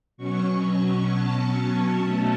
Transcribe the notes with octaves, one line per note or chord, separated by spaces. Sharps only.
B2 F#3 C#4 C#6
C#6
A5
A5
B2 A3 C#4 A5